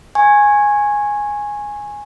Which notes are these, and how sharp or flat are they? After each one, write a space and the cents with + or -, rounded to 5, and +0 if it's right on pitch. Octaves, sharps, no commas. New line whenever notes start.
G#5 -5 C#6 -30